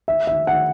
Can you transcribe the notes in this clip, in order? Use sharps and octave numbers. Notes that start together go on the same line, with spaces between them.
E5
E5
F#5